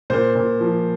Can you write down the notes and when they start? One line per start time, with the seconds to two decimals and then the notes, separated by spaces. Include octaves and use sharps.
0.10 A#2 C5
0.35 A#2
0.60 F3